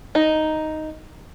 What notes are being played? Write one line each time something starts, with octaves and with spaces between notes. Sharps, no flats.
D#4